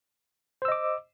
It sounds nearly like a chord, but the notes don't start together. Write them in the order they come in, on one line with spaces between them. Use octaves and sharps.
C5 E6 D#5 D6